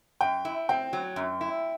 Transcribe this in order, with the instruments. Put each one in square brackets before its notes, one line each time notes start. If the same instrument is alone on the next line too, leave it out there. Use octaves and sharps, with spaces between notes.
[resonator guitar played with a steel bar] F#2 [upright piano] G5
[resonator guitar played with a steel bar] E4
[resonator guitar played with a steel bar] C4 [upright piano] G5
[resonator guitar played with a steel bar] F#3
F#2
E4